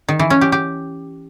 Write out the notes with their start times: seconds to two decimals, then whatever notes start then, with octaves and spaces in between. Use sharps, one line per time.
0.09 D#3
0.19 E3
0.30 C#4
0.41 G4
0.52 G4